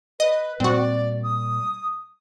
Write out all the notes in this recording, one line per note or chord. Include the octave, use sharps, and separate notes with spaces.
B4 D#5
A#2 G3 C4 F#4 D5
D#6